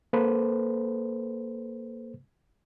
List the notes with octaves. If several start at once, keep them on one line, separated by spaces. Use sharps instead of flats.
A#3 A4 B4 C5